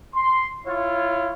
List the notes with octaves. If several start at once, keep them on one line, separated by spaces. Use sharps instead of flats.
C6
E4 F4 C#5